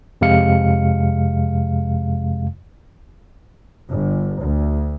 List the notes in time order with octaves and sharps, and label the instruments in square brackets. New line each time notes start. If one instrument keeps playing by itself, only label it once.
[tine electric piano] F2 C3 G#3 F5 C#7
[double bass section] G1
D2